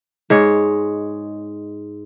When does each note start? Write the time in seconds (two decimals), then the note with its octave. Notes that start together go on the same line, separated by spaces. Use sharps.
0.30 G#2 G#3 C#5